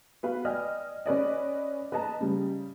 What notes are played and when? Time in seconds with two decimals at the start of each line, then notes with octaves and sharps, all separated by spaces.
0.23 B3 F#4 B4 F5
0.45 D5 D#5 G5 G#5 F6
1.06 C#4 B4 D5 D#5
1.92 B4 D#5 A5 A#5
2.20 C#3 G3